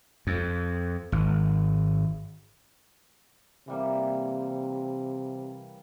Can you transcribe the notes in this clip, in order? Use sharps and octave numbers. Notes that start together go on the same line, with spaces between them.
F2
G#1
C3 E3 G3 A#3